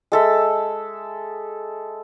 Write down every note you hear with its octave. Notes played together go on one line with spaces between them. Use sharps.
G#3 A4 E5